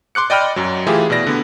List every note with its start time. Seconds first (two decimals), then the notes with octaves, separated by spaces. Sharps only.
0.15 C6 D6 F#6 C#7
0.30 D5 D#5 G5 B5 F6
0.56 F#2 F#3
0.87 E3 A3 E4 F4 G4 G#4
1.10 B2 E4 D5 A#6
1.27 D3 B3